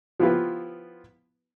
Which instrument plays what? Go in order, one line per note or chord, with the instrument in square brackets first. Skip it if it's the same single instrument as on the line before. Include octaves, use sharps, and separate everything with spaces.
[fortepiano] F3 B3 E4 F4 G4 B4